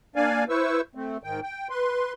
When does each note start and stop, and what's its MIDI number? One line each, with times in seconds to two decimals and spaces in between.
0.16 0.44 58
0.16 0.44 62
0.16 0.44 74
0.16 0.44 77
0.16 0.44 80
0.49 0.81 64
0.49 0.81 71
0.49 0.81 72
0.49 0.81 85
0.49 0.81 88
0.95 1.17 57
0.95 1.17 60
1.23 1.40 44
1.23 1.40 51
1.23 1.40 79
1.42 1.68 79
1.70 2.13 71
1.70 2.13 84